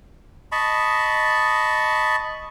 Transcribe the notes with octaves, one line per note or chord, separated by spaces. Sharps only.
D#5 A5 B5 C#6